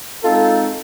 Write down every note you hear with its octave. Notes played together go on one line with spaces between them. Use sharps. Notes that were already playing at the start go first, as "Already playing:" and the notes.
G#3 C4 D#4 F4 A4